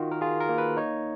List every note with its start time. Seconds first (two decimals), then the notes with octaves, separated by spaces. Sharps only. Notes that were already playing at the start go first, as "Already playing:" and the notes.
Already playing: D#3 F4 F#4
0.11 A#4
0.21 F4 G#4
0.40 A#4
0.49 A#3
0.58 B4
0.77 D#4 C#5